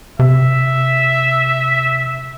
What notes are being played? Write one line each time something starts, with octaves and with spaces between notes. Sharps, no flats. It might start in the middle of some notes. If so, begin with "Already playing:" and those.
C3 E5